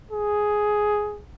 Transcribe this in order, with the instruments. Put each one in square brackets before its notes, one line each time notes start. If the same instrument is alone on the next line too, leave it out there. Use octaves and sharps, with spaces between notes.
[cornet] G#4